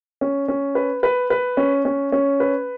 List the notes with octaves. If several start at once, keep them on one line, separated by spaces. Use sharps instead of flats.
C#4
C#4
B4
B4
B4
C#4
C#4
C#4
B4